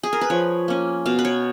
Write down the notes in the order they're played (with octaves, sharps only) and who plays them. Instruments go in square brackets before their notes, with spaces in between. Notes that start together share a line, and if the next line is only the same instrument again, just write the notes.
[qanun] G#4
A#4
B4
F3 C#5
A#3 C#4
B2 F5
B4
C#5